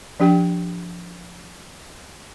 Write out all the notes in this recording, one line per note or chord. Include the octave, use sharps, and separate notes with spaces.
F3 D4 G4 G5